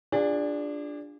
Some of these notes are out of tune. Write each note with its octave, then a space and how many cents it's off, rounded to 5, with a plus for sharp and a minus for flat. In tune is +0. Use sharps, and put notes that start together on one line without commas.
D4 +0 F4 +0 G#4 -35